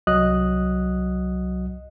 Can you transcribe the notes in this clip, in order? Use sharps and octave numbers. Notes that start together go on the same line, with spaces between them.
C2 F#3 F#4 D#5 D#6 F#6